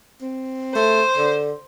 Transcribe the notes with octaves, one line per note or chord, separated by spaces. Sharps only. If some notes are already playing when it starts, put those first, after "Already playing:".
C4
A3 C5
D3